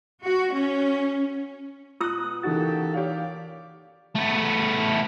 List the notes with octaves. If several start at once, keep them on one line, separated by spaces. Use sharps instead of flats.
F#4
C#4
B2 F4 D#6 E6 F#6
C#3 E3 A#3 D#4 F#4 G4 A4 A6
G4 C#5 D5 F5
A3 B3